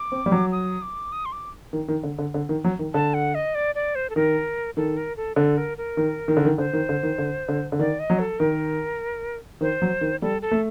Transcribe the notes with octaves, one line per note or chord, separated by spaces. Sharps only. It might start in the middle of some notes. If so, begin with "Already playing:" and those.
Already playing: D6
C4
G3
F#3
D#6
D6
D#6
C6
D6
D#3
D#3
D3
D3
D3
D#3
F#3
D#3
D3 A5
F#5
D#5
D5
D5
C5
A4
D#3 A#4
D#3 A4
A#4
A4
D3 A4
A#4
A#4
D#3
D#3
D3
D#3
D3 C5
D#3
D3
D#3
D3
D3
D3
D#3 D5
D#5
F#3
A4
D#3 A#4
D#3 C5
F#3
D#3
G3 A4
A4
A3